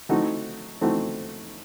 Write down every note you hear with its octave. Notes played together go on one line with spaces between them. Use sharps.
E3 A3 C4 D#4 F#4
E3 A3 C4 D#4 F#4